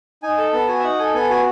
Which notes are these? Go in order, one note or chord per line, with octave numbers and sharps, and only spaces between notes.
D#4 G#5
A4 A5
B3 A5
F#4 G#5
E5
D#4 F#5
A4 G#5
B3 G#5
F#4 G#5